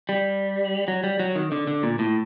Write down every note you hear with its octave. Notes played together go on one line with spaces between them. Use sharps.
G3
F#3
G3
F#3
D#3
D3
D3
A#2
A2